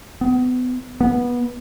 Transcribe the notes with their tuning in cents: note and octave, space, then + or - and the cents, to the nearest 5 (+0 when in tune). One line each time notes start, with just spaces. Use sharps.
B3 +30
B3 -20